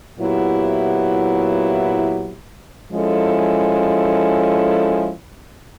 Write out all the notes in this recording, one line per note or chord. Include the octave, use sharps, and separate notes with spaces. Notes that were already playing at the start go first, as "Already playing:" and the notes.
A#2 F#3 B3 E4 G4
F3 G#3 C#4 E4 A4